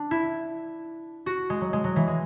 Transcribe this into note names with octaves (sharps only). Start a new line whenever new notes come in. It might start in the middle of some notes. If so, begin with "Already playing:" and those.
Already playing: D4
E4
F#4
G#3
F#3
G#3
F#3
E3
G#3